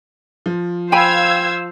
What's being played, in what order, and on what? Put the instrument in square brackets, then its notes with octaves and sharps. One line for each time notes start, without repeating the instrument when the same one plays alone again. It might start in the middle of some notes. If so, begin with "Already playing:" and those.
[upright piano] F3
[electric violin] C5 [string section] F5 E6 G#6 [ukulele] G5 G#5 B5